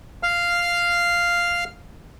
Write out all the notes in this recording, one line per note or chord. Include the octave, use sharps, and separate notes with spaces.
F5 F6